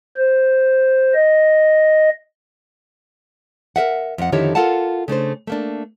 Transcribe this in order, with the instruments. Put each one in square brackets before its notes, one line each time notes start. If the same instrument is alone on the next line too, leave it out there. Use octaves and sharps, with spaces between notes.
[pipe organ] C5
D#5
[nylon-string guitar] A#4 B4 E5 F#5
F2 F#5
F2 D3 D#3 E4 G4 C#5
F4 A4 A#4 F5 F#5 A5
C#3 A3 D4 C5
A3 A#3 D4